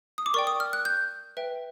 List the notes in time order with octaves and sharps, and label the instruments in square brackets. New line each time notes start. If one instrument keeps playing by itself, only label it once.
[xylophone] D#6
D6
A#4 D5 G5 C#6
D#6
F6
F#6
G6
B4 E5 G5